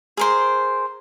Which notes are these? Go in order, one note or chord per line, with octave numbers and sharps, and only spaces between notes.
G#4 A#4 C5